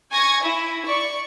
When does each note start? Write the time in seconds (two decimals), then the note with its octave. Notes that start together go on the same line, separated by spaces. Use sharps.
0.12 G#5 C#6 G#6 A#6
0.40 E4
0.85 D5 C#6